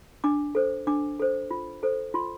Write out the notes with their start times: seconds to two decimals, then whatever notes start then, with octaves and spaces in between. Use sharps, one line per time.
0.24 D4 D6
0.55 A4 C5
0.87 D4 D6
1.20 A4 C5
1.51 F4
1.83 A4 C5
2.14 F4 C6